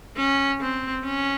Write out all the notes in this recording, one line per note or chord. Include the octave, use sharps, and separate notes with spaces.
C#4
C4
C#4